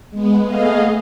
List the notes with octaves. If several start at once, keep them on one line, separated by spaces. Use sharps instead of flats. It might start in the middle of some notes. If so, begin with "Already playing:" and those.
G#3 B3
A3 B3 G#4 D#5 F5